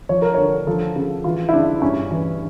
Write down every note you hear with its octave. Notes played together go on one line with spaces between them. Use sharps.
F3 C#5
A#4
D3 C#5
F3 A4
C#3
E3 F4
E4
C#3 D4
G2 C#4
E3